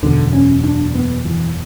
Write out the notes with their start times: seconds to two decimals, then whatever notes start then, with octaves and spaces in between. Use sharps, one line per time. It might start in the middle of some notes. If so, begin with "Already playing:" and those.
0.03 F#1 E2 B2 D3
0.33 C#4
0.64 D4
0.95 B3
1.25 E3